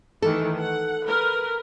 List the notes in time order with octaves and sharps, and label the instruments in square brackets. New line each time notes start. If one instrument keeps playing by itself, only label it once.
[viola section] D#3 E3 A3 [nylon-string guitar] A4
[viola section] F#5
A#4 B4